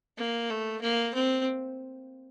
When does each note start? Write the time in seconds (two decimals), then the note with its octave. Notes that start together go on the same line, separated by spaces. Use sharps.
0.17 A#3
0.50 A3
0.81 A#3
1.15 C4